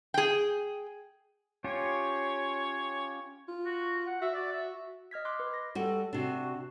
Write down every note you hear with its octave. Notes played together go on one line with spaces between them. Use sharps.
G#4 G5
C#4 F4 G4 C#5
F4
F#4
F#5
F#4 E5
D5
E5
D#5 F6 G#6 B6
C6 D6 F#6 G#6
B4
A#6
G3 F#4 A4
C3 D4 F#4